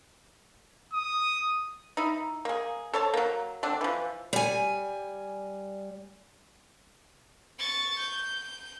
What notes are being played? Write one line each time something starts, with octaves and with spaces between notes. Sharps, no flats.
D#6
D#4 E4
A#3 G#4
A4 C5 C#5 A5
F#3 A#3
D3 C4 D4
E3 F3
G3 G#5
C#6 A6
G6